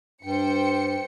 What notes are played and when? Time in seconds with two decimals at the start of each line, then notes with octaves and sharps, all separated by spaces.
0.23 G2 C5 G5 C#7